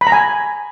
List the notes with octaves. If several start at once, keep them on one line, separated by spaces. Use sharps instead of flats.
B5
A#5
G#5